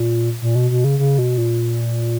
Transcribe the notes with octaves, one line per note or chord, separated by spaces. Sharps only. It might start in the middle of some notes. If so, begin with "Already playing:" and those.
Already playing: A#2
A#2
B2
B2
C#3
C#3
B2
A#2